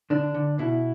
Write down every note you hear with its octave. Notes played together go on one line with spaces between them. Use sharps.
D3 D4
D3
B2 E4